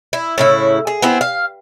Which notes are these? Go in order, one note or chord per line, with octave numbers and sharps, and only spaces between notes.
E4
A2 C#3 E4
G#4
B3 C4 E4 G#4
F5